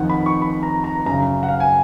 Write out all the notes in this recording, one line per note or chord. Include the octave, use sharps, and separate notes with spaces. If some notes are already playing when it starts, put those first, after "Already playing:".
Already playing: F2 D#3 F#5
B5
C#6
B5
A#5
A#5
F#2 C#3 A#5
F#5
F5
G#5